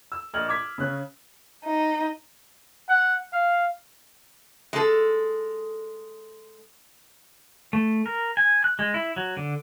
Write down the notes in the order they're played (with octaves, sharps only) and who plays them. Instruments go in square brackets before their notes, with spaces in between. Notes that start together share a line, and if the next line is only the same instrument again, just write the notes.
[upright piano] E6
A#1 D#5 F6 F#7
D6 G#6 B6
C#3 C#4 F#6
[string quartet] D#4
[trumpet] F#5
F5
[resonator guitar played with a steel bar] G#3 A4
[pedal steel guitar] A3
A#4
G#5
F#6
G#3
E4
F#3
D3